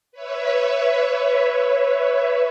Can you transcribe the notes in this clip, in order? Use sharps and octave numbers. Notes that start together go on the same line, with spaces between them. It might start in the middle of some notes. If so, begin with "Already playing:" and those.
B4 C#5 E5